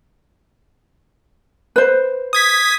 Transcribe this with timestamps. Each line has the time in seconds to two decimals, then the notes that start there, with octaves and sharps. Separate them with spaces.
1.76 B4 C5
2.33 D#6 G#6 B6